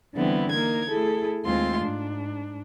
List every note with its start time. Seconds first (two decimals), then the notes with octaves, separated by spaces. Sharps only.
0.15 D3 E3 G3 B3 C4 E4
0.51 A#3 D#4 A#4 G#6
0.89 A3 E4 G#4 A4
1.45 D#2 G#3 A3 C4 F4 C6
1.82 G#2 D4